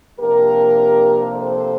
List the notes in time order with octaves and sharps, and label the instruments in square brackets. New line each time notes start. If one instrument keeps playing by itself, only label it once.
[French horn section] C3 F3 A#3 D4 G4 A#4
A4 C5